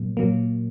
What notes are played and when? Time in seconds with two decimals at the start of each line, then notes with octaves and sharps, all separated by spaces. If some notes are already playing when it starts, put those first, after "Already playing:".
Already playing: A#2 F#3 A#3
0.17 A#2 F#3 A#3